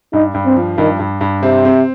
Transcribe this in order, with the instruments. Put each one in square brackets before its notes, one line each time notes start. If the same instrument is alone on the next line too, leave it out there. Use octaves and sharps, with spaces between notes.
[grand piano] G2 [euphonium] D#4
[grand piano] G2
[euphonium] C4
[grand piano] F3
[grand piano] G2 [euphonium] D#3
[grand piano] G2
G2
[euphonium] C3 [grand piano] C4
[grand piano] C4